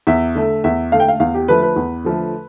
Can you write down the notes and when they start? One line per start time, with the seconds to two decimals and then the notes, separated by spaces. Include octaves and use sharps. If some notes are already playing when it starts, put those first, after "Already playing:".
0.07 E2 E5
0.35 D3 A3
0.64 E2 E5
0.92 D3 A3 F5
1.00 G5
1.08 F5
1.20 E2 F5
1.34 G4
1.48 D3 F3 A3 B4
1.63 B4
1.76 E2
2.04 D3 F3 A3